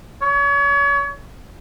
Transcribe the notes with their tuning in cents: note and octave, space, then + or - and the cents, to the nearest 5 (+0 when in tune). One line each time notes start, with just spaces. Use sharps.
C#5 +35